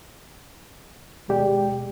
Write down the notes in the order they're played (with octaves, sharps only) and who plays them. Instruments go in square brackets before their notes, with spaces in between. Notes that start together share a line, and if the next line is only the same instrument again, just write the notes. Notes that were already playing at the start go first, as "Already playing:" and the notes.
[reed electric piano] D#2 B2 G#3 G4 D5 G5